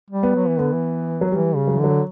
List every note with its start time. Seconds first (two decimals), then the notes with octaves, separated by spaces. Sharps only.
0.11 G3
0.23 B3
0.35 F#3
0.48 E3
0.59 D3 B3
0.73 E3
1.21 F#3
1.31 E3 G3
1.55 C#3
1.67 F#3
1.75 E3
1.80 D3 F#3